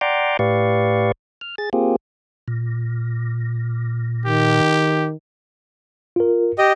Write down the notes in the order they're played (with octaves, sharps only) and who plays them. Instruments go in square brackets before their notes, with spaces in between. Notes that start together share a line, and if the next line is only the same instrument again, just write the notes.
[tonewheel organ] D5 F#5 G5 A#5 C6 D6
A2 G4 B4 D5 F5 C#6
F6
G#4 A6
A#3 C4 F4 G4 G#4
A#2
[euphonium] D#3 [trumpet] G4
[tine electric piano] F4 A#4
[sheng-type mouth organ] G4 D#5